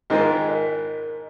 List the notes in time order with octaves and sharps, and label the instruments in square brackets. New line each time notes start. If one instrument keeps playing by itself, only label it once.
[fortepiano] G#2 D#3 G#3 F4 [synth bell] A#4 D#5
[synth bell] A#4 D#5